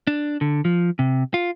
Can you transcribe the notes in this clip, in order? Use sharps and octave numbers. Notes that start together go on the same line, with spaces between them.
D4
D3
F3
C3
F4